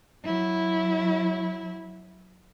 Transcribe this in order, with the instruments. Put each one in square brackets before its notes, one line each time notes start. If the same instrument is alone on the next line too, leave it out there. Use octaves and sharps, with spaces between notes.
[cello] F#3 E4